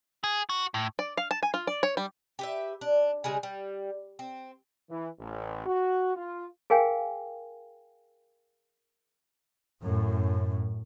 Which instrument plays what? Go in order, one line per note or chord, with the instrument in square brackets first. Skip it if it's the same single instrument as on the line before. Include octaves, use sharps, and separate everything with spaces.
[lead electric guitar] G#4
F#4
A2
[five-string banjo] D5
F5
A5
G#5
F4
D5
C#5
G3
[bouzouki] G4 B4 E5
D4
C#3 G3 G#3 G#4
G3
C4
[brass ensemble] E3
A1
F#4
F4
[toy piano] G#4 A#4 F5 G5 G#5
[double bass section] F#2 A2